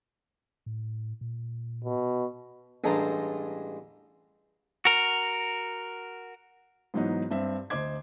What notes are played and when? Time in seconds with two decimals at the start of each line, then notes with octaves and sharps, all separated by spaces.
0.66 A2
1.21 A#2
1.84 B2
2.84 A1 G2 G#3 A5 A#5
4.85 F#4 A#4
6.94 G#2 E3 F#3 B3 D#4
7.31 G2 C4 E5
7.70 D2 C5 D#5 D6 G#6